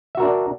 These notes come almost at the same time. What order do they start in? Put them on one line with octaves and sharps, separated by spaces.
E5 F#4 A#4 D4 D5